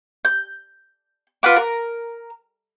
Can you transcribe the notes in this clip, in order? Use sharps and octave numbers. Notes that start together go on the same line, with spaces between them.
G6
F4 B4 F#5 D6
A#4